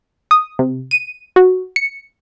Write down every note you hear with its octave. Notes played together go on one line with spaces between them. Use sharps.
D#6
C3
D#7
F#4
C#7